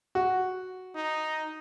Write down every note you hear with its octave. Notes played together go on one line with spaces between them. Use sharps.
F#4
D#4